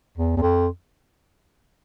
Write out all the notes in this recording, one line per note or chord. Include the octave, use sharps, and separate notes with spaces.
E2
E2
F2